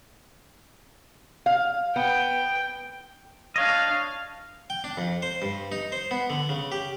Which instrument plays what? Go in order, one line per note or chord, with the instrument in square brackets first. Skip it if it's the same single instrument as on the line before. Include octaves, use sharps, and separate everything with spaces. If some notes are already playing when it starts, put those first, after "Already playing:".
[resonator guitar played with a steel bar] F5
[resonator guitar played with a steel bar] B3 [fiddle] G5
[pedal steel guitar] D4 C#5 D#5 [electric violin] F5
[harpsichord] G5
D4
F2
C5
G2
D#4
C5
B3
D3
C#3
G4